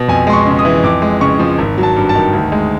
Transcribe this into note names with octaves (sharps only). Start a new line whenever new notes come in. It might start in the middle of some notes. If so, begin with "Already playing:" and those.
Already playing: B2
F2 G#5
G#3 C6
C#6
C#3
D#6
E3
F2 D6
G#3
C#3 C#6
F3
G#1
F#3
A5
G2
A5
D#3
D2
G#3